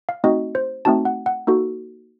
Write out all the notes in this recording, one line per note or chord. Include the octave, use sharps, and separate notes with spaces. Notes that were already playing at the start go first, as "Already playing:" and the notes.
F5
A3 C4 D#4 F#4 D#5
C5
A3 C4 D#4 F#4 A5
F#5
F#5
A#3 D#4 F#4 A4